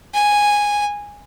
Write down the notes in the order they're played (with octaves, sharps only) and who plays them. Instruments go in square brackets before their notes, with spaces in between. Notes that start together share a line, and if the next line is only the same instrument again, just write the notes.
[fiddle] G#5